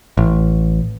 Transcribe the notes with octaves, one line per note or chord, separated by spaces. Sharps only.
A1